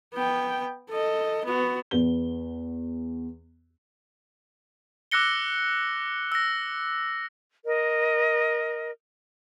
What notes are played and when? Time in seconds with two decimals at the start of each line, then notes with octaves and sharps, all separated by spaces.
0.13 B3 G5
0.90 A4 D#5
1.45 B3 F#4
1.91 E2 B3 G7
5.11 D6 E6 F#6 A#6 C#7 G7
6.32 E6 A#6
7.65 A#4 D#5